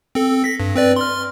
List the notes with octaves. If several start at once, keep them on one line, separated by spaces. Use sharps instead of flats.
C4 A4
A#6 B6
G2
C4 B4 D5
C6 F6